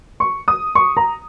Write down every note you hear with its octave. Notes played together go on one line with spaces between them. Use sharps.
C#6
D#6
C#6
A#5